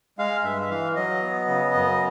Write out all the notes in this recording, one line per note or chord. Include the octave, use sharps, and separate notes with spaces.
G#3 F5
G2 E5
E5
E3 F5
F#3 D#5
B3
C#3
F#2